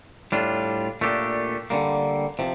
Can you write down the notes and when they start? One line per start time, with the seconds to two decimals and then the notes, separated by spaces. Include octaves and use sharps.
0.32 A2 G3 D4 F4
1.01 A#2 A3 D4 G4
1.70 D3 G3 A#3
2.39 C3 F3